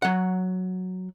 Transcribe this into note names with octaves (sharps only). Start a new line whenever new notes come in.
F#3 F#5